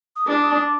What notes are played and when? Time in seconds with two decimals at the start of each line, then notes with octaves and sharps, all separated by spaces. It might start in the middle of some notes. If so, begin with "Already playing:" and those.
0.16 D#6
0.27 D4 D6
0.42 D#6
0.58 D6